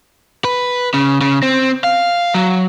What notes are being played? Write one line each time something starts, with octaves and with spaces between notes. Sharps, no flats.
B4
C#3
C#3
C4
F5
F#3